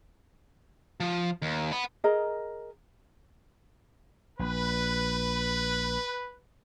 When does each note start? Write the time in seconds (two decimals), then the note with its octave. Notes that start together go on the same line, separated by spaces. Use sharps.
1.00 F3
1.42 D#2
1.72 F#5 B5
2.04 G#4 A#4 D#5 A#5
4.39 A#1 B4